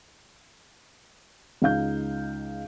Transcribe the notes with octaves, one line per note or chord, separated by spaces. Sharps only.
C#2 D#4 F5 G6